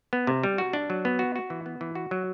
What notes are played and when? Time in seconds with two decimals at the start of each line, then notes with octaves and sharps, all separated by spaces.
0.13 B3
0.27 C3
0.44 G3
0.58 F#4
0.73 D4
0.90 F#3
1.05 B3
1.19 F#4
1.36 F#4
1.50 E3
1.66 B3
1.81 E3
1.95 F#4
2.11 F#3